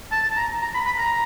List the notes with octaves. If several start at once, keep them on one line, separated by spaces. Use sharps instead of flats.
A5
A#5
A#5
B5
B5
A#5